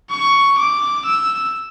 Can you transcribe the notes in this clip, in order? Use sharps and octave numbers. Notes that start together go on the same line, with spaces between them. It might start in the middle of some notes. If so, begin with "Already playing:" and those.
C#6
D6
E6